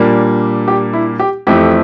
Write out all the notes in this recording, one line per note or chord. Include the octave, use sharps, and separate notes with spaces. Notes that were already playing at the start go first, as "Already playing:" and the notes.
Already playing: A#2 G3 A#3 D4
G4
E4
G4
F2 E3 A3 G4